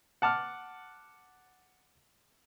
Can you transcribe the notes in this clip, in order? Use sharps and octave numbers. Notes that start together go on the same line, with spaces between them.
F#5 A5 D6 F6